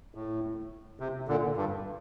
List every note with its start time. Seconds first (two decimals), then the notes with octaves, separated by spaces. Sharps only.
0.15 A2
1.00 C3
1.28 A#2 D3
1.57 G2